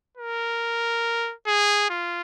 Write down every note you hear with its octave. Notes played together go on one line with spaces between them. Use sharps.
A#4
G#4
F4